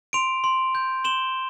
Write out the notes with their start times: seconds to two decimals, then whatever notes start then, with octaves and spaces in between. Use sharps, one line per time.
0.13 C6 D7 F7
0.44 C6
0.75 G6
1.04 C6 E7 G7